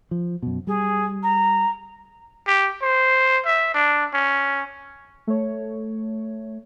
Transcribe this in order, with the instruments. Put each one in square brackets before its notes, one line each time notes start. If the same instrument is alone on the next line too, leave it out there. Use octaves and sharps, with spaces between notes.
[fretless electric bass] F3
F#2 B2
[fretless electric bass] G3 [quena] G#4
[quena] A#5
[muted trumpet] G4
C5
E5
D4
C#4
[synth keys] A3 C#5